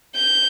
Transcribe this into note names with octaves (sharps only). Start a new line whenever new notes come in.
G6